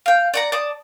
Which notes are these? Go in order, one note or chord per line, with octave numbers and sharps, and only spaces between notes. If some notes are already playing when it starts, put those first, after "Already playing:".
F5 G5
D5 F#5 A#5
D5 A5 D#6